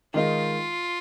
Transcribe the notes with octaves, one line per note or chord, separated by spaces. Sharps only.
D#3 G#3 D#4 F4 A#4 F5